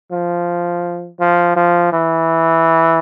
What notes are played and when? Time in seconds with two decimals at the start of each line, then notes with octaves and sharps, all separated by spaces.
0.12 F3
1.20 F3
1.56 F3
1.93 E3